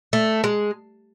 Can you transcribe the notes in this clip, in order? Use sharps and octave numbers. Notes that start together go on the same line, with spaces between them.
A3
G#3